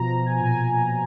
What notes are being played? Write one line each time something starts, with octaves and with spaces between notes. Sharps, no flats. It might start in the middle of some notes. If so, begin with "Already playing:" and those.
Already playing: B2 F3 A#5
F3
G#5
A#2